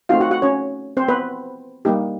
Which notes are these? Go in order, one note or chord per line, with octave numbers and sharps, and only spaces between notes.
A3 C4 D#4 F4 F#4 F5
F#4 F#5
F#4 F#5
C#4 C#5
C4 C5
B3 B4
G3 A#3 D#4 G4